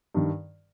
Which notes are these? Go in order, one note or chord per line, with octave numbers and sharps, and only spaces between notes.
G2 D#3